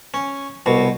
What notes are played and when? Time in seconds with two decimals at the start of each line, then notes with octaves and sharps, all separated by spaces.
0.14 C#4
0.66 C2 B2